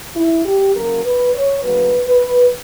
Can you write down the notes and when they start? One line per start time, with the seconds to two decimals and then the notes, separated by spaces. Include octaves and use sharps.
0.15 E4
0.45 G4
0.74 F#2 C#3 F#3 A#3 A#4
1.04 B4
1.34 C#5
1.62 D2 C#3 F#3 A#3 B4
2.07 B4